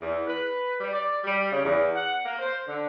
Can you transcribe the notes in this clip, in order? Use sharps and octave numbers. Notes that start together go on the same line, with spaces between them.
E2
B4
G3
D5
G3
C#3
E2
F#5
A#3
C5
D3